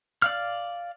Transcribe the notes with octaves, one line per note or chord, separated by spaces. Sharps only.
D5 F5 F6